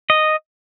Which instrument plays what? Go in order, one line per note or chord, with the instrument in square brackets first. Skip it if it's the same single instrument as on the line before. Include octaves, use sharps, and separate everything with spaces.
[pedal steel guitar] D#5